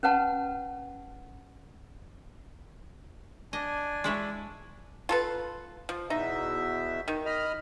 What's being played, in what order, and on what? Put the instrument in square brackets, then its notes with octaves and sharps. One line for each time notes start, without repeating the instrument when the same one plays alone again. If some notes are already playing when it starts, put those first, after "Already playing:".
[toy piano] C#4 B4 F#5 A5
[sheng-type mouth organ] D4 G#5 [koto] D#5
[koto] G#3 E4 C#5
[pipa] F4 A4 B4
F3
[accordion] E2 B2 E5 [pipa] D#4
[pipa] D#3
[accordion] D#5 B5 F6